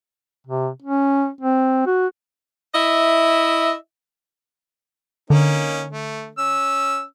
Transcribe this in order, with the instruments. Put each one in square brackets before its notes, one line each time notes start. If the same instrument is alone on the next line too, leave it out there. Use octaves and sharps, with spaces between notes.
[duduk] C3
C#4
C4
F#4
[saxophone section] E4 D#5 E5
[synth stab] D3 [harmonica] A#3 C#4 D#4
[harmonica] A3
C#4 E6